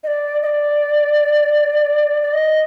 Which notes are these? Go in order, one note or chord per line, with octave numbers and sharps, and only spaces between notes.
D#5
D5
D#5
D5
D5
D#5